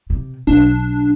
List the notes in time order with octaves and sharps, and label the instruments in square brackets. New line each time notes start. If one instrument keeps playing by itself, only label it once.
[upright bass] C3
[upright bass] B1 [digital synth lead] D4